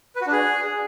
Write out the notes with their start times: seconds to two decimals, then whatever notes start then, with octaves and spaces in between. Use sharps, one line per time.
0.16 B4
0.21 F#4
0.27 D4
0.32 G#4